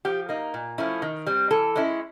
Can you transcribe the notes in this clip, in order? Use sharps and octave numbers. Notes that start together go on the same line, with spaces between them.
F3 G4
A#3 D#4
A#2
F3 A3 C#4 E4
D#3
G3 C4
E3 A4
G#3 C#4 E4